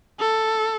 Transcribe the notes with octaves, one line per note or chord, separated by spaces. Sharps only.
A4